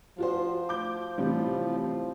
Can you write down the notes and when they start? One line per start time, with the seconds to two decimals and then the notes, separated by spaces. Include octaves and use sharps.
0.18 F3 F4 F#4 C5
0.69 D6 G6
1.18 A1 C3 G3
1.79 F3